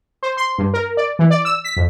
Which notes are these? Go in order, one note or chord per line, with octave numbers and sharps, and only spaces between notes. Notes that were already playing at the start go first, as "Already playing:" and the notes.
C5
C6
G2
A#4
D5
E3
D5
E6
B6
F2